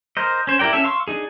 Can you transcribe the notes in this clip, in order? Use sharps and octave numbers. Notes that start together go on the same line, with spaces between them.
A#4 C5 D#5
C#4 C5
E4 G4 A#4 D5 G5
C#4 A4 E5
F5 C6 C#6 E6
D4 D#4 G#4